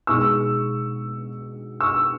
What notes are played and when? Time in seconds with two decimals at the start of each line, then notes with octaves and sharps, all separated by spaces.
0.07 B2 G#3 D#4 C#6 E6
1.80 C#6 E6